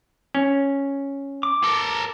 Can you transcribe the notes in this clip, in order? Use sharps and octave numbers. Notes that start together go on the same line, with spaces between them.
C#4
D6
A4 A#4